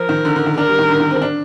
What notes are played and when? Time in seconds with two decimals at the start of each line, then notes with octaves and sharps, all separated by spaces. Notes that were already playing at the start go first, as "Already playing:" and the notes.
Already playing: F3 A#4
0.09 D#3
0.25 D3
0.36 D3
0.46 D#3
0.57 D4 A#4
0.68 G3
0.79 D#3
0.89 D3
1.00 D#3
1.11 C4
1.22 D4